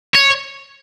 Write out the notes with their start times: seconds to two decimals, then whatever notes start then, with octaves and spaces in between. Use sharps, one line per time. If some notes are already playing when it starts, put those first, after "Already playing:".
0.14 C#5